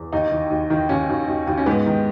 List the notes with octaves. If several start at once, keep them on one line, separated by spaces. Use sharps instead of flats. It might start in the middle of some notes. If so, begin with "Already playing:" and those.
Already playing: E2
D#2 D#4
D#3
D#2
D#3
D#2 C#4
D#2
D#2
D#2
C#4
G#2 B3
D#3